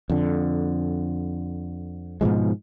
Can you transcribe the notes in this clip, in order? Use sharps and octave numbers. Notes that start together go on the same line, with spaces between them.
F2 D3
G#2 B2 F3 G#3